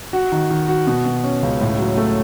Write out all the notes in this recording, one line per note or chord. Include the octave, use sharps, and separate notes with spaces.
F#4
D#3
D#3
F#4
B2
B2
C#4
C#2
A2
F#3
A3